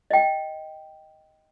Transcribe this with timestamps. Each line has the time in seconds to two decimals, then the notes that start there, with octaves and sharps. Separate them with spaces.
0.11 D#5 G5